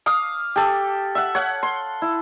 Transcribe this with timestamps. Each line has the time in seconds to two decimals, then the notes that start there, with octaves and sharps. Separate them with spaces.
0.06 F5 D6 D#6
0.56 G4 A4
1.15 E5 F#5
1.35 C#5 F5 F#5
1.63 C6
2.02 E4